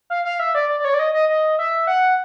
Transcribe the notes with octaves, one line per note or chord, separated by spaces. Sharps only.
F5
F5
E5
D5
D5
D5
C#5
D5
D#5
D#5
D#5
E5
F#5